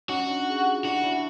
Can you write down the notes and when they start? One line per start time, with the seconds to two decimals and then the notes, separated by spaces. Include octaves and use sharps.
0.09 C#4 D#4 F#4
0.28 D4
0.50 G#4
0.59 G4
0.68 F#4
0.76 F4
0.85 D4 E4 F#4
1.04 D4 E4